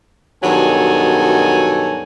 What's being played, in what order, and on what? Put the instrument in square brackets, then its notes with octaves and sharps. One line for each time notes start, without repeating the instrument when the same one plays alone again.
[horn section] G2 B2 D#3 F#3 A4 G#5